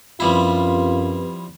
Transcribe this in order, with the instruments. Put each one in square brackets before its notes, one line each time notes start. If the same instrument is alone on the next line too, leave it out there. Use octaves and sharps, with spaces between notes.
[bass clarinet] F#2 [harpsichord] F3 G3 E4 [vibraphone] C4 G4 B4 [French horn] F4